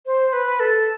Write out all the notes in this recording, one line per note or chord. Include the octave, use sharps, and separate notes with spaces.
C5
B4
A4